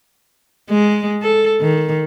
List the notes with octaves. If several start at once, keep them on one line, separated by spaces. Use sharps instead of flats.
G#3
A4
D#3